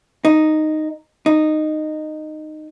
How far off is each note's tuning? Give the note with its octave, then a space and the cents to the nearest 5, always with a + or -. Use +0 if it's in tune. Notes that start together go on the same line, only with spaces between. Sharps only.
D#4 -5
D#4 -15